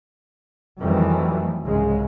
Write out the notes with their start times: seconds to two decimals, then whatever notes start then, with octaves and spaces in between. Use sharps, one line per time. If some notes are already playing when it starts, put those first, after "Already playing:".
0.81 F2 D#3 E3 F#3 G3 A3
1.65 C2 G#2 C#3 G#3